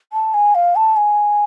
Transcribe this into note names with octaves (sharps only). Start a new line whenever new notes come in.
A5
G#5
F5
A5
G#5